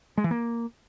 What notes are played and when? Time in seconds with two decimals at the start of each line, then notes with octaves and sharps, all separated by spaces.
0.17 G#3
0.24 E3
0.31 A#3